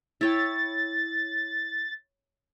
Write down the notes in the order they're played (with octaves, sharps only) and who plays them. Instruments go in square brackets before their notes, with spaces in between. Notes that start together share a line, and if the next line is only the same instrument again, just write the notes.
[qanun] E4 C#5 G5 [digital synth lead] A6